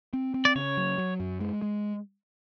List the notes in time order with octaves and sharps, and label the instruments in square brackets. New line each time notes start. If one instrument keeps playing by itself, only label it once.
[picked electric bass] C4
C4
[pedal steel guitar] D5
[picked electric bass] C#3 [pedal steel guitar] C#5
[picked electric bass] F#3
F#3
F#2
G#3
G#3